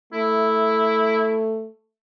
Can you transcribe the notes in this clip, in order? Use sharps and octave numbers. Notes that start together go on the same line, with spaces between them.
A3 E4